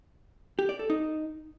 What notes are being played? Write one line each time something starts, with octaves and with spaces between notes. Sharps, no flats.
G4
D5
A4
D#4